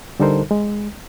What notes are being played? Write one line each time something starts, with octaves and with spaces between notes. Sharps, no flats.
D3 G3 D#4 A4 A#4 C5
G#3